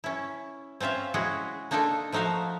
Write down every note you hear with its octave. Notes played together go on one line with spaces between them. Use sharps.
C#4 E4
C4 C#4 F4 E5 F5
G#3 C#4 E4 F#4 G#4
A#3 D4 D#4 F4 A4
F3 A3 D#4 F#4 E5 F5